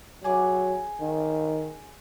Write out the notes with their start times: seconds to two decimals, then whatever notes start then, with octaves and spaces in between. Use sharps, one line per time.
0.24 F#3 G#4 D6
1.01 D#3